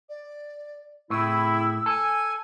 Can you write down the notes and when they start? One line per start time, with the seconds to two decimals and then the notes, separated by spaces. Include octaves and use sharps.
0.09 D5
1.10 A2 C#3 C4 E4 E6
1.86 A4 G#5